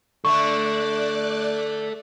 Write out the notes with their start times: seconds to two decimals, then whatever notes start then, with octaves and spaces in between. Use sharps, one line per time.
0.25 D3 A3 A4 D5 E5 C#6 F#6